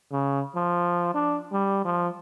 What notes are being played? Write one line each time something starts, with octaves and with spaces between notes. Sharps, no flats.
C#3
F3
D4
G3
F3